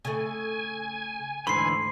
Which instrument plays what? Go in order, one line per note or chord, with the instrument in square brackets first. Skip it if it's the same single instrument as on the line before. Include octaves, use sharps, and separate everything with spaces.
[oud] C#3 A3 [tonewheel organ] G#5
[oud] D2 G#2 C#5 [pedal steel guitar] D3 E3 B5 [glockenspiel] C6 C7